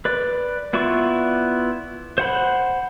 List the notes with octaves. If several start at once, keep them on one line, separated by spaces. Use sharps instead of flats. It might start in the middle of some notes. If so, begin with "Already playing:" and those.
B4 D5
B3 E4 F4 D5 C#6
C5 F#5 B5